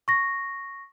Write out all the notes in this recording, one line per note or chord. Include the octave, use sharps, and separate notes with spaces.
C#6 A#6